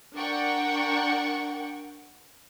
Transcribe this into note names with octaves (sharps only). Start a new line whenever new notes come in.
D4 A#4 F#5 G5 C#6